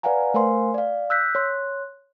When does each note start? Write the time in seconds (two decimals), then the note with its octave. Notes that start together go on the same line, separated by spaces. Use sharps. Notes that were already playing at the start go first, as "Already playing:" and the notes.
0.03 B4 D5 F5 F#5 G#5 A#5
0.34 A3 A#4 C5 F5 G#5 C6
0.74 D5 F5
1.10 E6 F#6 G6 B6
1.35 C#5 C6 F#6